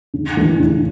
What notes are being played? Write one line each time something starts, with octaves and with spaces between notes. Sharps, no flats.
C#3
E3 A3 D4
C#3